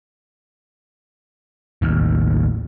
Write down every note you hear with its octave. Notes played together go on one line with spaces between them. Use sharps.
A1 D#2